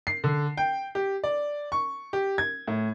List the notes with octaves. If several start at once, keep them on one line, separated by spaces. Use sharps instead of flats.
C7
D3
G5
G4
D5
C#6
G4
G#6
A2